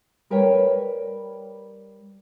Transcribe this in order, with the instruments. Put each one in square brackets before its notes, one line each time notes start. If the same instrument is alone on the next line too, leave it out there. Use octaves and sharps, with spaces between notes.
[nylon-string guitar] G3 A#4 B4 C#5 G5